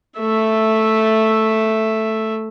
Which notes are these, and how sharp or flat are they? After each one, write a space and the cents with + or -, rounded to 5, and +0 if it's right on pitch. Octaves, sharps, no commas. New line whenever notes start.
A3 +0 E5 +0